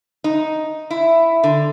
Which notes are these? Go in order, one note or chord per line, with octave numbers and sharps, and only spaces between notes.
D#4
E4
D3